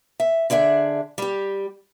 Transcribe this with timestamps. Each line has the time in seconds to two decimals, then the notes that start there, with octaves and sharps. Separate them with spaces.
0.20 E5
0.50 D3 D4 G#4 E5
1.18 G3 G4